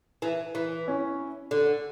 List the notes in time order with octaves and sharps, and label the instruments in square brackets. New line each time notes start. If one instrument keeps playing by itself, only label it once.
[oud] E3
E3
[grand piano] C#4 E4
[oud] D3